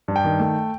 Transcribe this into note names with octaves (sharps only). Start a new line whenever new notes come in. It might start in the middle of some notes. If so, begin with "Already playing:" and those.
G2
G5
D#3
A3